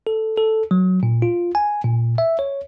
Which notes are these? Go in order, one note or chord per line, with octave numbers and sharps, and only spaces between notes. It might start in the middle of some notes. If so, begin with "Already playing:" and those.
A4
A4
F#3
A#2
F4
G#5
A#2
E5
C#5